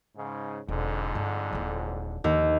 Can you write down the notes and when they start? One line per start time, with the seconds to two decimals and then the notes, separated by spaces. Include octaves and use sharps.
0.16 G#2 C#3
0.69 E1 F2 G#2 D3
1.15 G2
1.53 D#1 E4
2.24 D#2